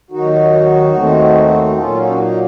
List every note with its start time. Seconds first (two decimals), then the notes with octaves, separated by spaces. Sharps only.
0.11 D#2 D#3 F#3 D#4 F#4
0.93 D#2 D#3 A3 C4
1.66 F#4
1.76 A#2 F#3 A#3 C#4 F4 A4
1.97 D#4 F#4
2.12 C#4
2.18 D#4